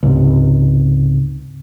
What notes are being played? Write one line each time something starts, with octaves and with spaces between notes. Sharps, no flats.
C#2 G#2 C3